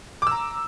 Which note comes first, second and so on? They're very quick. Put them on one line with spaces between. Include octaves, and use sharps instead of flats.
D6 E6 A#5